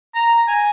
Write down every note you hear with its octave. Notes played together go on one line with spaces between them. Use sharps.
A#5
G#5